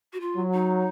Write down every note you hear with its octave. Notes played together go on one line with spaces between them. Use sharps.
F#4
F4
F#3
D#4